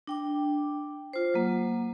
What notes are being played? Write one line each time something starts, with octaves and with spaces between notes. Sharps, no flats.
D4 G5 D6
F4 C5
F#3 A#3